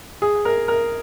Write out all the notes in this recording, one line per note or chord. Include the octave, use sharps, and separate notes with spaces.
G#4
A#4
A#4